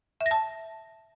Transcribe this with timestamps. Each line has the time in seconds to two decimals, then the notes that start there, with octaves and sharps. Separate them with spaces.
0.21 E5
0.26 A#6
0.31 A5